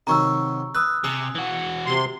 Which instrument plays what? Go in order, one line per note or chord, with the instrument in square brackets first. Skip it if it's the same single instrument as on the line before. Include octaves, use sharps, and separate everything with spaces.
[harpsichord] C3 D#3 F#3 [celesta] A#5 C#6 E6
[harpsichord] B4 [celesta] D#6 E6 F#6
[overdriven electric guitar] C3 [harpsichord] G#4
[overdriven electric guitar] E3 F#4
[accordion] C3 C6